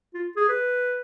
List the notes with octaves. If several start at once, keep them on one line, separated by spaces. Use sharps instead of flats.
F4
G#4
B4